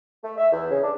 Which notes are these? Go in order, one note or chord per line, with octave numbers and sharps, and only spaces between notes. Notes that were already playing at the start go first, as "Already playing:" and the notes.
A3
E5
E2
C#3
D4